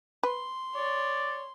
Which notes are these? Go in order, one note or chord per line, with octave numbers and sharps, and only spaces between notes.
B4 C6
C#5 D5